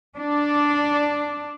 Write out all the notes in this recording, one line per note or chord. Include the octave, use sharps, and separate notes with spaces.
D4